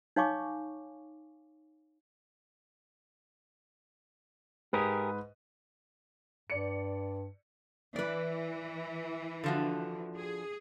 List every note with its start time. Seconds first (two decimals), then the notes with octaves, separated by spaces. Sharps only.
0.16 D#4 C#5 F5 G#5 C#6 D6
4.73 G#2 G4 G#4 A#4 B4 D#6
6.50 G2 D5 C#7
7.96 E3 B4 D5
9.44 D3 F3 F#4
10.17 G#4